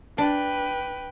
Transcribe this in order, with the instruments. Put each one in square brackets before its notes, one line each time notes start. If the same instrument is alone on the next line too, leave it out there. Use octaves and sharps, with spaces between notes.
[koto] D4 [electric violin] B4 G5